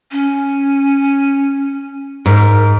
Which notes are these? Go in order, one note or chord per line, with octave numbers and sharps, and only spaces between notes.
C#4
G#2 A#4